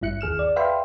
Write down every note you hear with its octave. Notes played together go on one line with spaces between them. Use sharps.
G#1 G2 E4 F#6 C#7
D#2 G#4 F6 E7
D5
B4 E5 F5 G5 B5 C6